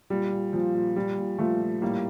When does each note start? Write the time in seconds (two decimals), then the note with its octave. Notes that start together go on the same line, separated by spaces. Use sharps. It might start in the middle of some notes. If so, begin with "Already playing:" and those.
0.10 A#2 G3
0.32 A#2
0.53 A#2 F3
0.75 A#2
0.96 A#2 G3
1.17 A#2
1.38 A#2 F3 A3
1.61 A#2
1.82 A2 G3 A#3